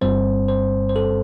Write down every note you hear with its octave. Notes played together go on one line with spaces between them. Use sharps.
G1 G2 G3 C4 C5
C5
C5
A4